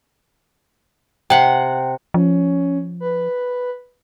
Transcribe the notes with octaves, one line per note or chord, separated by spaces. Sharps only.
C3 F#5 G5
F3 C#4
B4